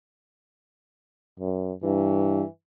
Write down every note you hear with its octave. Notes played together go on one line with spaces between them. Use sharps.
F#2
G2 E3